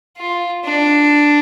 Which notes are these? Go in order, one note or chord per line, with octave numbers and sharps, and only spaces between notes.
F4
D4